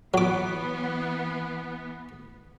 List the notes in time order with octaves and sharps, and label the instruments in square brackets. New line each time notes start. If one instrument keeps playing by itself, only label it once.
[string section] E3 B3 [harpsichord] F#3 D6